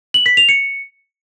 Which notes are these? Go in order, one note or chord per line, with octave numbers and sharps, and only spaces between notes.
F#7
B6
F7
C#7